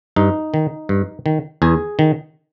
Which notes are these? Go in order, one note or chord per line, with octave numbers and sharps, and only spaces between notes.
G2 D#4
D#3
G2
D#3
E2 G#4
D#3